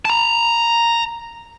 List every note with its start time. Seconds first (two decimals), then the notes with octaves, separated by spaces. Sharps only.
0.05 A5 A#5